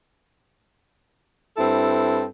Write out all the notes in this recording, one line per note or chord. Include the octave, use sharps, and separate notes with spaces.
G2 C4 E4 A4